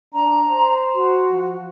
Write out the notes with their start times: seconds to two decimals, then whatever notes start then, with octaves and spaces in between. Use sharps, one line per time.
0.14 D4 A#5
0.49 C5
0.95 F#4
1.31 F3